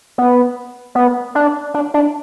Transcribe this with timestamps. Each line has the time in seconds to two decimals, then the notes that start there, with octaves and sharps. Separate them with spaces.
0.18 B3
0.95 B3
1.35 D4
1.74 D4
1.94 D4